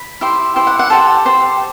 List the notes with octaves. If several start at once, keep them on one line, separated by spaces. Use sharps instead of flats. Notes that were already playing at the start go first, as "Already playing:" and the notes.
Already playing: B5
E4 G4 C5
E4 G4 C5
F#5
F#5
G4 A4 C5 A5
G4 C5